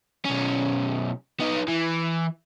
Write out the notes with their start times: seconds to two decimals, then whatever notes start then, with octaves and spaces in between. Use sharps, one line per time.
0.25 B1 C#4
1.40 B3 D#4
1.68 E3